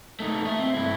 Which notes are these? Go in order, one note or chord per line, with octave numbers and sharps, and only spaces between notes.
A3 D#4
A3 E5
C4
G2 E4